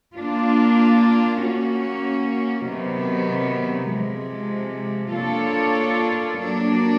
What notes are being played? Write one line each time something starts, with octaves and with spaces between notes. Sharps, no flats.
A#3 D4 F4
A#3 C#4 F#4
C3 D#3 F#3 B3
C3 F3 G#3
A#3 D4 F4 A4 C#5
F#3 A#3 D4